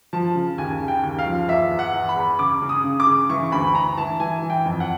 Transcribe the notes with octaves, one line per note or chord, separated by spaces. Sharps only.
F3 A5
C#3
D#2 G#5
C#3
G5
D#2
F5
F3
E2 E5
E2
F#5
E2
B5
E2
C#3 D6
C#3
D#6
C#3
D6
C#3
E3 C#6
D2 B5
D2 A#5
E3 A5
E3 G#5
E3
G5
F2
F#5